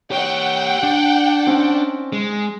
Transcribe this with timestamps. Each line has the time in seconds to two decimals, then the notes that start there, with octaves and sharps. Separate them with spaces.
0.11 G4 C#5 F#5 G5
0.83 D4
1.47 C4 C#4 D#4
2.13 G#3